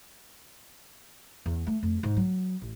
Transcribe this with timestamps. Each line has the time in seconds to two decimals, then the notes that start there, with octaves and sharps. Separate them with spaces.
1.46 E2
1.67 A3
1.83 F2
2.03 G#2
2.17 F#3
2.62 A1